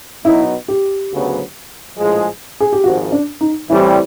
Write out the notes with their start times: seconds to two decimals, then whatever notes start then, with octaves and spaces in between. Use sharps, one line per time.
0.25 B2 F#3 B3 D#4 E4
0.68 G4
1.11 D2 C#3 F#3 B3
1.97 A#1 A2 F3 G#3
2.60 G#4
2.73 G4
2.83 G#1 G#2 F3 F#4
3.12 D4
3.41 D#4
3.69 A2 E3 G3 C4 E4